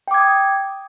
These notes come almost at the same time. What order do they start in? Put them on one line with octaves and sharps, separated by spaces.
G5 D6 G#6 D#6